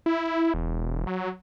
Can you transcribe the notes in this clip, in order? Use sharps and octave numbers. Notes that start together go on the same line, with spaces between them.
E4
E1
F#3